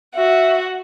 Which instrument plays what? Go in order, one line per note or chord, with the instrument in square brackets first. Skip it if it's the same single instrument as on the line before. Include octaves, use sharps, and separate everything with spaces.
[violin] F#4 [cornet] E5